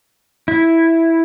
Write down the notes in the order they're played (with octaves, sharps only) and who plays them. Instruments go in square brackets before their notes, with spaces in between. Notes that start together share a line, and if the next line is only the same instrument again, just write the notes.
[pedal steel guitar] E4